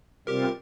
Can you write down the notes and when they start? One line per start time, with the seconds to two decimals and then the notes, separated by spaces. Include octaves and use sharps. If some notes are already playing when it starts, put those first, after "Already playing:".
0.27 C3 G3 C4 F4 G4 A#4